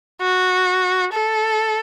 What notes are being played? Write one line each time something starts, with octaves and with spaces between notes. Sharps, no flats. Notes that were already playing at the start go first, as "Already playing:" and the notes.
F#4
A4